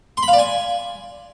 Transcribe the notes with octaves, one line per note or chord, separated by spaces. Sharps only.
C6
B5
F5
D5
G#5